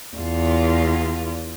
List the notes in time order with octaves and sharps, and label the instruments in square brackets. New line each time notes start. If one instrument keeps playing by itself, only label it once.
[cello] E2 F4